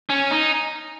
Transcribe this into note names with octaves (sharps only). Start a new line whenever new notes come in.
C#4
D#4